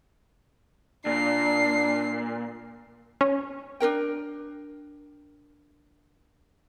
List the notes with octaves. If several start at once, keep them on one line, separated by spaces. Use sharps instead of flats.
A#2 D4 C7
C#4
D4 G#4 A#4 G5